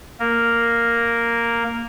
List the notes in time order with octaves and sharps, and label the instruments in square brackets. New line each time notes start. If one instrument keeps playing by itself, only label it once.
[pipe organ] A#3 A#4